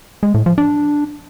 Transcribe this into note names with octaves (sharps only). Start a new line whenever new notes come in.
G#3
A2
F3
D4